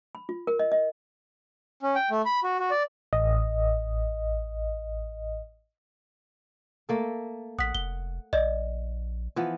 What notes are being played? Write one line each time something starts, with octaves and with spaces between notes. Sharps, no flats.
B5
F4
A#4
D#5
D#5
C#4
G5
A3
B5
F#4
F#4
D5
A1 D#5
A3 A#3 A4
A1 F#5 D#6 B6
F1 G7
A#1 D5 D#5
E3 F3 B3